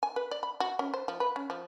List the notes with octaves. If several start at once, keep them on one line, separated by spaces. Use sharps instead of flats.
G#5
B4
D5
B5
F#4
C#4
C5
F3
B4
C#4
F3